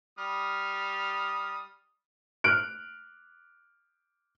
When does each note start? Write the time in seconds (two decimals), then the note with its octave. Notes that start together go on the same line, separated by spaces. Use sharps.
0.18 G3 D#6 F6
2.44 F6 F#6 D7